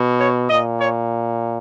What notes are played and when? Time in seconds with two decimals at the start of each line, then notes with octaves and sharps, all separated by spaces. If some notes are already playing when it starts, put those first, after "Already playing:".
Already playing: B2
0.20 C#5
0.50 A#2 D#5
0.80 C#5